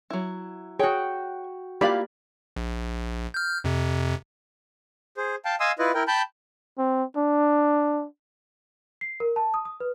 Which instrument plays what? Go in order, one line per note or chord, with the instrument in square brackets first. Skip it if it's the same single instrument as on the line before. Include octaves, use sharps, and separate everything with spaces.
[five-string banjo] F#3 E4
[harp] F#4 G5 [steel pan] G#4 [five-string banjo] C#5
[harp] A#3 [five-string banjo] E4 F4 F5 [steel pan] G4 D5 B5
[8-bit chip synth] A#1
F6 G6
F2 C3
[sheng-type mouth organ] G#4 C5
F5 G5 A5
D#5 F5 G#5 C6 D#6 E6
E4 F4 B4 D#5
E4 A#4 G5
G5 A5 B5 G6
[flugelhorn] C4
D4
[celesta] C7
A#4
A5
D#6
D#6
B4